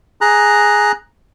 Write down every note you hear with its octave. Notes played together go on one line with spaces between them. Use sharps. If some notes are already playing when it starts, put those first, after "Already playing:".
G#4 A#5 F#6